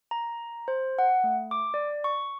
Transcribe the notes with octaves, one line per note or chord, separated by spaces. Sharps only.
A#5
C5
F#5
A3
D6
D5
C#6